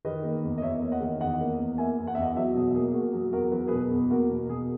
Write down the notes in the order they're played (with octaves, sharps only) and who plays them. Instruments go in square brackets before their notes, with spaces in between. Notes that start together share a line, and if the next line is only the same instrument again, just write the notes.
[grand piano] D#3 B4 D#5
A#3
E2
D#5
E2 C#5 E5
A#3
D#5 F#5
D#3
E2 D#5 F#5
A#3
E2
A#3 E5 G#5
E2
F#5
E2 E5
D#5 F#5
F#3 C#5 E5
B2 G#4
A#3 G#4
G#4
A#3 F#4
F#3 G#4
E2 F#4 A#4
F#3 B4
A#4
B2 G#4 B4
E2
A#3 F#4 A#4
B2
B2 G#4